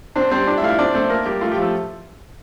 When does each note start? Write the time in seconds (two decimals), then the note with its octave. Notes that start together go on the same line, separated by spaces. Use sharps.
0.16 C4 D4 C5
0.31 G3 C4 C5
0.47 D4 D5
0.57 E4 E5
0.63 A3 F5
0.68 E4 E5
0.79 C4 D4 D5
0.94 A3 C4 C5
1.09 A#3 A#4
1.25 G3 G4
1.41 A3 F4
1.51 G4
1.56 F3
1.62 A3 A4